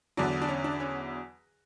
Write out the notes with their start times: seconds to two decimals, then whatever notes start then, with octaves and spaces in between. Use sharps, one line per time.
0.17 E2 D3 F#3 D4
0.42 D4
0.49 C#4
0.64 D4
0.80 C#4